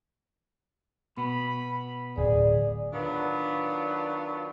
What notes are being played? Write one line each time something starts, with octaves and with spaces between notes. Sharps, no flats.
B2 B3 B5
D1 G#4 D5
D#3 F#3 B3 D4 F4